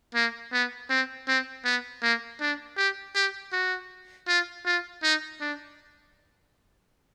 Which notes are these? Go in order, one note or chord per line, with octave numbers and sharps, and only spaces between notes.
A#3
B3
C4
C4
B3
A#3
D4
G4
G4
F#4
F4
F4
D#4
D4